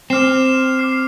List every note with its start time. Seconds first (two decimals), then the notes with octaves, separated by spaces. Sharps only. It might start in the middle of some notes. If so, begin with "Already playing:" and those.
0.10 C4 D6 F6 C7 E7
0.78 D6 F6 C7 E7